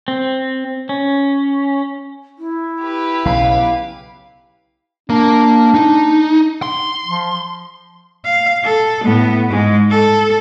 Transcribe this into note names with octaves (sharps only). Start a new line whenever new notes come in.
C4
C#4
E4
G4 B4
B1 C#3 F5
A#3 D4 A#4
D#4
C6
F3
F5
A4
A2 B3
G#2 G#3
A4